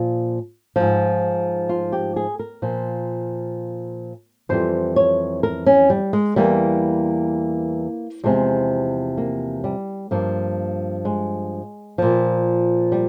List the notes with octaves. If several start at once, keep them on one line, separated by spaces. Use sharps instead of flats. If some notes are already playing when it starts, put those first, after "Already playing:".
Already playing: A#2 F3
G#2 F3
F4
G4
G#4
A#4
A#2 F3
F2 E3 G3 C5
C#5
A#4
C#4
G3
G#3
E2 E3 G3 A#3
E2 C3 F3 G#3
A#3
G3
G2 F3 A#3
G#3
A#2 F3
G3